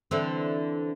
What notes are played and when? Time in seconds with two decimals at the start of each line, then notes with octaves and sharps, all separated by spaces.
0.11 D3 E3 C4